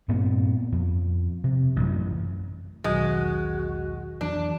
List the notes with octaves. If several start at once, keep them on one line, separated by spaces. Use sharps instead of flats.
G2 A#2 B3 C4
F2
C3
A1 F#2
E1 B1 B2 D#3 F#3 G#3 F#4
F2 E3 F#3 D4